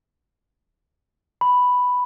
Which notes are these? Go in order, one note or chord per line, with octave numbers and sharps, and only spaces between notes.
B5